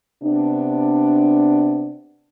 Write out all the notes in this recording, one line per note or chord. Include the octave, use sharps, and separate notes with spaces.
C3 B3 D4